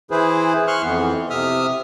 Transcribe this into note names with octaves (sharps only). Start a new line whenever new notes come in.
E3 E4 G#4 B4 C5
C6 C#6 F6 F#6
F2 E3 B3
C3 E5 D#6 F6